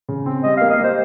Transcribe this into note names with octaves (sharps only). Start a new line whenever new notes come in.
C#3
C4
G3 D#5
F5
A#3
D#5
G3 C5